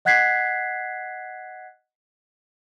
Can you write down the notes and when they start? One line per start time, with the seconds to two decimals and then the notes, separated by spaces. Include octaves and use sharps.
0.05 D#5 F#5 F#6 G#6 B6 C7